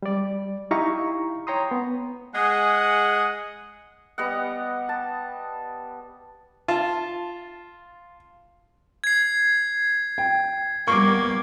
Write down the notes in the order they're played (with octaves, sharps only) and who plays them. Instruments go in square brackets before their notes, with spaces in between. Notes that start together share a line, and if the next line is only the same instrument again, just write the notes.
[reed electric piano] G3 D5
D#4 E4 G4 F5 A#5 C#6
C#5 G5 A#5 C6 D#6
B3
[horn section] G#3 G#4 D#5 F#5
[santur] G3 B3 D#5 F#5
A5
[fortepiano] F4 A5
[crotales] G#6 C7
[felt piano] G5
[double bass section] G3 B3 [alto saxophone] A#3 [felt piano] C#6 D6